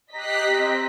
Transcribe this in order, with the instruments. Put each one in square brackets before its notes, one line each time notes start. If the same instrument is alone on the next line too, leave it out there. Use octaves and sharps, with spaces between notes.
[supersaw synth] G4 F#6 C7 [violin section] D#5 B6 [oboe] A#5
[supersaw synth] C4